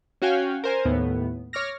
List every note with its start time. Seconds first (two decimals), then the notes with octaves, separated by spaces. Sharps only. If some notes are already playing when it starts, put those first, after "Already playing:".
0.22 C#4 F#4 F5 G5 G#5
0.64 A#4 C5 G#5
0.85 D#2 A2 B3
1.53 C#5 D6 F6 A#6